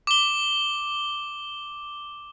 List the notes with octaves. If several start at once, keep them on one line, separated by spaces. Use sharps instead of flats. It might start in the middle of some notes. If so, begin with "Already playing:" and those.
D6 G7